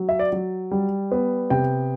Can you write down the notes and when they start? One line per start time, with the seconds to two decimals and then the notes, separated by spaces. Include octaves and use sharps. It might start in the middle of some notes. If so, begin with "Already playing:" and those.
Already playing: F#3
0.09 E5
0.19 D5
0.32 F#3
0.71 G3
1.12 B3
1.50 C3 G5